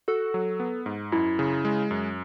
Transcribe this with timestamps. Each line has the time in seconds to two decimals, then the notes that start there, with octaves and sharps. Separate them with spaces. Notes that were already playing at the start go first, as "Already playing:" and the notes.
0.08 F#4 A4
0.34 F#3
0.60 B3
0.86 G#2
1.12 F#2 E4
1.39 C#3
1.65 G#3
1.91 F#2